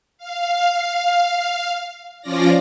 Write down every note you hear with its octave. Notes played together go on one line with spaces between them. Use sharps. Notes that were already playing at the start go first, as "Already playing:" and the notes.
F5
F3 C#4 F4 D5 A#6